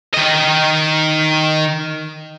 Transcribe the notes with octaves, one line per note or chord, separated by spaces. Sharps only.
D#3 D#5